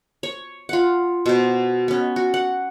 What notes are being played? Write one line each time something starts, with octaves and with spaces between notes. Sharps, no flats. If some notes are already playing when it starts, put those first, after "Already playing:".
C#5
F4 F#5
B2 C5
B3 C#4
F#4
F#5